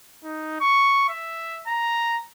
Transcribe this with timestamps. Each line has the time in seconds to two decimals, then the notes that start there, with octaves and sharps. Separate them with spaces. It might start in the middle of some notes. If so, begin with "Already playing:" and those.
0.23 D#4
0.60 C#6
1.09 E5
1.67 A#5